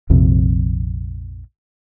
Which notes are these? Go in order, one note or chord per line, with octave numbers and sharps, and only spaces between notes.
A#1 F2 C3